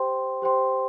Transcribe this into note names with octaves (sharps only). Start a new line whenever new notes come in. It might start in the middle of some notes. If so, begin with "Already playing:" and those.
Already playing: G4 C5 G5 C6
G4 C5 G5 C6